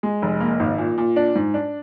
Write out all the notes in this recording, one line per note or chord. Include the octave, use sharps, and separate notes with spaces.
G#3
F1
A#3
G#1
A#2
A#2
D4
G#2
D4